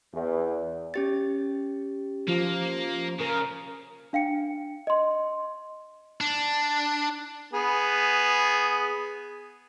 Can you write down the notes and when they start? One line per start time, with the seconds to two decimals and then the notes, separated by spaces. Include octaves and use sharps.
0.13 E2
0.94 C#4 G4 A6
2.28 F3 A#3
3.20 C#3 A#4
4.13 D4 F5 G5 C#7
4.87 D#5 C6
6.21 D4
7.53 B3 G#4